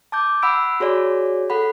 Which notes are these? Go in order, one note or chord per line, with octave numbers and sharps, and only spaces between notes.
A5 D6 G6
F#5 B5 E6 D7
F#4 G#4 C#5 D5
A4 F#5 B5